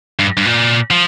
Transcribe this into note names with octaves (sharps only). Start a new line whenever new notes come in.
G2
G2
A#2
F3